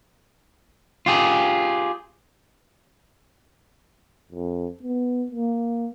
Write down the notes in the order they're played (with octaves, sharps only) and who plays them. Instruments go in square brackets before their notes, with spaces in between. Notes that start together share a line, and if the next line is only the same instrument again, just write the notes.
[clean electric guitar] F4 G4 G#4
[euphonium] F2
B3
A#3